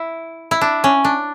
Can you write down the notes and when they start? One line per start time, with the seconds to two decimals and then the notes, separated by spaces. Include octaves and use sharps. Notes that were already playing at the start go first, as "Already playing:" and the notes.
Already playing: E4
0.51 E4
0.61 D4
0.84 C#4
1.04 D4